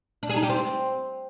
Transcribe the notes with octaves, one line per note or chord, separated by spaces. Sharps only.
D4
G#4
D#4
G4
C4